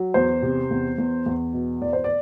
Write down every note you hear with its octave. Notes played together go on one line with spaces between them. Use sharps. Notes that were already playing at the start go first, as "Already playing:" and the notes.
Already playing: F#3
E2 C5
C3
E2
E2
E2
B2
E3 D5
C5
D5